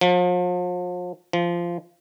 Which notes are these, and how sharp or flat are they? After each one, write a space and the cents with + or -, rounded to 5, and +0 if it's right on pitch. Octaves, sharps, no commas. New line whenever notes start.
F3 +40
F3 -15